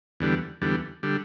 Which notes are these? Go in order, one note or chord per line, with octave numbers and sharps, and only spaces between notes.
E2 D3 G3
E2 D3 G3
D3 G3